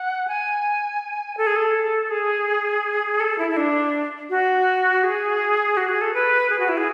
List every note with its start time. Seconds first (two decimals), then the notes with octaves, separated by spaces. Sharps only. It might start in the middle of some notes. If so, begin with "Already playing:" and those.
Already playing: F#5
0.28 G#5
1.37 A4
1.47 G#4
1.56 A4
2.10 G#4
3.20 A4
3.38 E4
3.50 E4
3.57 D4
4.30 F#4
5.03 G#4
5.77 F#4
5.89 G#4
6.01 A4
6.14 B4
6.50 G#4
6.59 F#4
6.69 E4
6.78 G#4